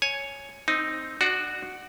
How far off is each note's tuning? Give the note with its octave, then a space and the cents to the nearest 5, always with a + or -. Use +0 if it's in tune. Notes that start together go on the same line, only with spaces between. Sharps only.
C#5 +0 G#5 +10
C4 +0 D#4 +0
D4 +35 F#4 +0 D5 +0